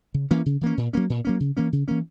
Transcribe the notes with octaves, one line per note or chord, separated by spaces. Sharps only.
C#3
E3 A#3 C#4
C#3
E3 A#3 C#4
A#2
F#3 A#3 C#4
A#2
F#3 A#3 C#4
C#3
E3 A#3 C#4
C#3
E3 A#3 C#4